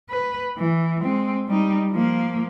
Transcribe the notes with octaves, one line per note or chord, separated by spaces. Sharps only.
B4
E3
G#3 C4
G3 D#4
F3 A#3